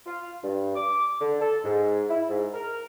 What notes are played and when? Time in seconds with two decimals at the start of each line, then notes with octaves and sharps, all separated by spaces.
0.06 F4
0.43 G2
0.76 D6
1.21 D3
1.41 A4
1.64 G#2
2.09 E4
2.29 G#2
2.54 A#4